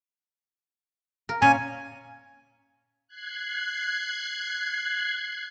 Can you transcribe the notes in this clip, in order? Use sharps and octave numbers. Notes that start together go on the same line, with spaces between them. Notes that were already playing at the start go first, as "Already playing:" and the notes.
A#4
A#2 C#4 G#5
F#6 G#6 C7